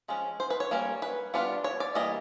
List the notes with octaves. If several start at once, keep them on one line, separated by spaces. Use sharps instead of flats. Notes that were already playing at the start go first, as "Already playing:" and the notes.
F3 G#3 C#4
C5
B4
C#5
G3 A#3 C#4
B4
G3 B3 D4 F4
C#5
D5
E3 G3 A#3 D#5